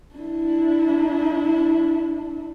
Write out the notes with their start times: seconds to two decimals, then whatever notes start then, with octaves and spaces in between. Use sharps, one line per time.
0.15 D4 E4